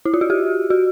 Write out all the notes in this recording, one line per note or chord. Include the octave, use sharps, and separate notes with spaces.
E4
F4
F#4
G4
F#4